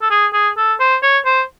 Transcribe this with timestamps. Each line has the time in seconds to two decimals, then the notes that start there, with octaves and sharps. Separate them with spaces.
0.02 A4
0.10 G#4
0.33 G#4
0.57 A4
0.80 C5
1.03 C#5
1.25 C5